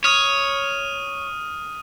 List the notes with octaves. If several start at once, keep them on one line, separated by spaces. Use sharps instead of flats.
C#5 D#6 F6 D#7